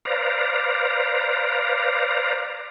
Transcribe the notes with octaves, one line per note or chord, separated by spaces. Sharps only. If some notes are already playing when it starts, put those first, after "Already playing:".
B4 C5 D5 F5 A#5